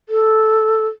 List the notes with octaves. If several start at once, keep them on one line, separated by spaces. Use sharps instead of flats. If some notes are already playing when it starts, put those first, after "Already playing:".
A4